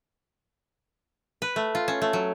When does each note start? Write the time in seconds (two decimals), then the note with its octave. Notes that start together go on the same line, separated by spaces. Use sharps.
1.42 B4
1.56 A3
1.75 F4
1.88 C#4
2.02 A3
2.13 F#3